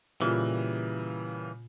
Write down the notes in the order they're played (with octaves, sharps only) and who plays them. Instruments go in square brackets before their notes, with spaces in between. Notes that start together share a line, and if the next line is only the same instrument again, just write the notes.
[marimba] A#2 F4 [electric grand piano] C#3 G3 A#3 [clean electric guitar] E3